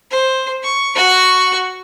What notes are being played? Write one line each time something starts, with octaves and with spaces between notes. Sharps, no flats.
C5
C#6
F#4 C#6